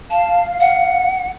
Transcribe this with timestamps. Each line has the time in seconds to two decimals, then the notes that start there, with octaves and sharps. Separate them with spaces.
0.10 F5 A5
0.60 F#5